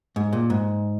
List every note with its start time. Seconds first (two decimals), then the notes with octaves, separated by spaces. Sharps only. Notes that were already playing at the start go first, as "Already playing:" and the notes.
0.16 G#2
0.33 A#2
0.50 G#2